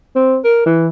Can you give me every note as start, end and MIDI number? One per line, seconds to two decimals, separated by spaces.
0.16 0.37 60
0.44 0.63 70
0.66 0.89 52